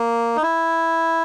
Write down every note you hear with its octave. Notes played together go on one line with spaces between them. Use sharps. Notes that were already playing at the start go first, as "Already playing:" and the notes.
Already playing: A#3
D#4
E4